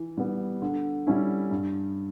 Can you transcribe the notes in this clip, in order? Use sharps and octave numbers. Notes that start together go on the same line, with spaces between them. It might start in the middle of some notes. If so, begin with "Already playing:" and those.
Already playing: E3
G3 B3
D3
G3 C#4 E4
G2